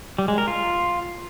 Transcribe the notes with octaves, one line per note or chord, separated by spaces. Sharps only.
G3
G#3
A#4
F4